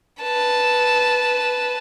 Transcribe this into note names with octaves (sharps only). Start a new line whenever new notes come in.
B4 A5